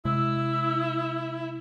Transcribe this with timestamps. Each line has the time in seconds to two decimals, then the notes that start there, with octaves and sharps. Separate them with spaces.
0.05 C3 G#3 E4 E6